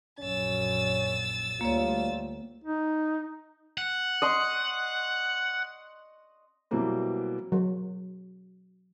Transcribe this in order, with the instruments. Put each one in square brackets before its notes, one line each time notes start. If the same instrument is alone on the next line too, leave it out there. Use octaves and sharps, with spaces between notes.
[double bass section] A#1 F#2 [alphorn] C#4 [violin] E6 A6
[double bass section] D2 G3 [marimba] A#3 C#5 [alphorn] F4
[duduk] D#4
[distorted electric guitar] F#5
[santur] D#5 C6 C#6
[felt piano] B2 E3 F#3 G3 A#3 C4
[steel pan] F#3